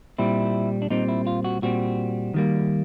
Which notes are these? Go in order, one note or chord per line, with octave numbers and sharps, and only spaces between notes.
A#2 G3 C4 E4
D4
A#2 G3 C4 D#4
E4
F4
F#4
A#2 G3 C4 F#4
D#3 G3 A#3